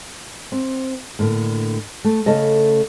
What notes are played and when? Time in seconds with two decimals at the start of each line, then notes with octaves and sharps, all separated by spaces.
0.52 C4
1.19 A2 D3 A#3
2.04 A3
2.26 C#3 A3 A4 D#5